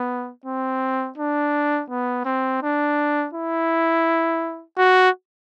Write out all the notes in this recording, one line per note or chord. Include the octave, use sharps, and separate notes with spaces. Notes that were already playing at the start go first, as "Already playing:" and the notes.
Already playing: B3
C4
D4
B3
C4
D4
E4
F#4